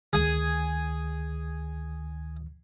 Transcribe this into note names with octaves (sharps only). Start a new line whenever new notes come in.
D2 D#3 G#4 G#5